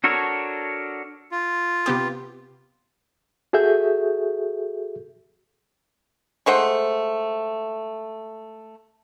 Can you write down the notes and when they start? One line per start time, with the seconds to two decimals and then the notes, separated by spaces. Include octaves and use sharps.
0.04 D4 F#4 A4 A#4 C#5
1.32 F4
1.86 C3 B3 G4
3.53 F#4 G#4 A4 E5 G6
6.46 G#3 A3 C5 F#5